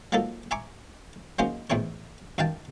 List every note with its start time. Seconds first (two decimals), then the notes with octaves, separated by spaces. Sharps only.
0.12 F3 F#3 A#3 D#4 A4
0.51 E5 G#5 A#5 C#6 D6
1.39 F#3 G#3 A#3 C#4 D#4 C5
1.70 E2 A2 C4 D#4 C#5
2.38 F#2 D#3 F5 G5 A5